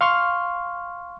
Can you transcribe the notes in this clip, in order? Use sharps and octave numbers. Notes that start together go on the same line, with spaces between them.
F5 C6 C#6 F6